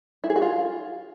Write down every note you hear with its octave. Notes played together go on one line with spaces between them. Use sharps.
E4
G#4
F#4
F4